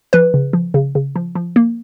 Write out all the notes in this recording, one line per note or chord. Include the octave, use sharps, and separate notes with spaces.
F3 B4
C#3
F3
C#3
C#3
F3
F3
A#3